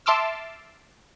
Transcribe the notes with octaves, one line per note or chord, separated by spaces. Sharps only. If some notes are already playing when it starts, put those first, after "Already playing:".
E5 A5 C6 D6 E6 F6